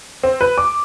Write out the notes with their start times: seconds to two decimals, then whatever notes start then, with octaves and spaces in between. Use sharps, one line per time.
0.23 C4
0.41 B4
0.58 D6